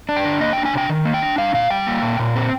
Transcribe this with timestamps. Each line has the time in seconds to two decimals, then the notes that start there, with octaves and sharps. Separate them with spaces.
0.09 D4
0.16 G5
0.25 D3
0.41 A#3 D#5
0.53 D4 G5
0.65 G#5
0.73 C3 G5
0.89 D#3
1.05 A#3
1.14 G5
1.22 D4
1.38 G3 F5
1.54 A#2 F5
1.70 G3 G5
1.87 A#3
2.02 A#2
2.19 A#2
2.35 C4